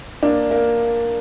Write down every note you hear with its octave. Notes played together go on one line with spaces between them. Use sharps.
A#3 D4
A#3